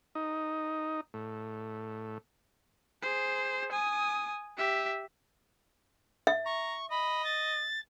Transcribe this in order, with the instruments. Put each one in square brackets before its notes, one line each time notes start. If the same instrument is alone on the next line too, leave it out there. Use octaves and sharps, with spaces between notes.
[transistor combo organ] D#4
A2
[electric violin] G#4 C5
G#5 D#6
G4 E5
[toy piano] E5
[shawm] A#5 [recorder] C#6
[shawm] D#5 [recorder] B5
[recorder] A6